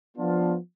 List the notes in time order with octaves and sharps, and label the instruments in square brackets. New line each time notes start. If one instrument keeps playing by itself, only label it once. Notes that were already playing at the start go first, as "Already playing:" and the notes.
[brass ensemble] F3 B3 D4 F4